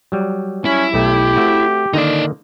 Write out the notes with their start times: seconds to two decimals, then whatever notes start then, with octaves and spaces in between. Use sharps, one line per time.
0.12 F#3 G3
0.65 C#4 E4
0.94 B1 A3 G4
1.37 A3 C4 F#4
1.93 D3 D#3 A#3 D#4 D5